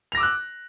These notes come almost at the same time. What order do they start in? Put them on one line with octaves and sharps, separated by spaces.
F7 A#6 D6 E6 F#6